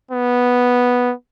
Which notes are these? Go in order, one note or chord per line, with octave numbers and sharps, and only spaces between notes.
B3